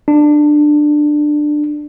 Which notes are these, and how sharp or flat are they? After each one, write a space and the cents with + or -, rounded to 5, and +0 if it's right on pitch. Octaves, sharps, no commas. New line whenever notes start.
D4 +15